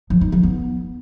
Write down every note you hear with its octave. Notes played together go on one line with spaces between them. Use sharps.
F3
D#4
F3
B3